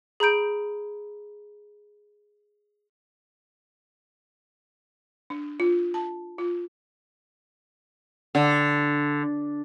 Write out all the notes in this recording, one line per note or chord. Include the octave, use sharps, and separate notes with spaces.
G#4 A#5 B5 G6 D7
D4
F4
A5
F4
D3